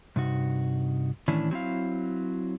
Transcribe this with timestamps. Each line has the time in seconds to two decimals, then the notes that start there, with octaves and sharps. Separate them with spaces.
0.16 G2 C3 D#4 F#4
1.28 A2 D#3 E3 C#4 D4 E4
1.51 F#3 C4 E4 F5